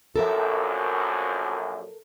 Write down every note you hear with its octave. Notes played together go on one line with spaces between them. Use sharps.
A#1 F#2 A4 A#4 E5